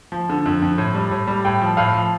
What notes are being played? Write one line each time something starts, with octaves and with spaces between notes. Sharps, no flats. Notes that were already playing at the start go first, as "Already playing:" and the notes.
F3
D3
F2
F2
A2
G3
A2
G3
A2 G5
F3
A2 F5
F3